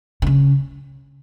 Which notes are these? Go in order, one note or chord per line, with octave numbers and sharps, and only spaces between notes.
C3
C#3